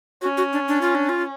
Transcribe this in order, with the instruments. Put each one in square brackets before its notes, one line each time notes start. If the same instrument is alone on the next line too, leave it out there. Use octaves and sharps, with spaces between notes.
[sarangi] C#4 [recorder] F#4
[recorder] F#4
D4
D4
F4
D4
F4